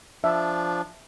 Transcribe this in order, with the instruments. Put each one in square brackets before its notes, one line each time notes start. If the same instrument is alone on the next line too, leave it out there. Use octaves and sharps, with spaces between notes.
[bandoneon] F3 D4 [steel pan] E5